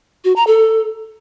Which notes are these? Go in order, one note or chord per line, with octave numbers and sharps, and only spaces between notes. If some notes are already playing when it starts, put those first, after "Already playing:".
F#4
A#5
A4